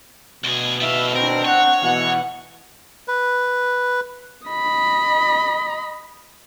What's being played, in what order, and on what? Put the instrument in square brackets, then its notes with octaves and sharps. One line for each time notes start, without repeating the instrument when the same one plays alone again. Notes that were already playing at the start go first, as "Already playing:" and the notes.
[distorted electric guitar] D2 G#4 [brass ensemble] B2
[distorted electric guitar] G3 F5 [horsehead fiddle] E5
[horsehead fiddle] C4 D4 [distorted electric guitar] A#4
[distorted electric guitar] C#5 [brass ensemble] F#5
[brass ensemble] B2 E3 [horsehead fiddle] F#5
[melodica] B4
[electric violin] D#5 B5